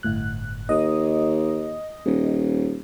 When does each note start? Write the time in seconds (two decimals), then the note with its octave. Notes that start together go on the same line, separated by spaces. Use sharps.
0.03 G1 A2 F#6
0.69 D#2 D#5 D#6
2.05 D#1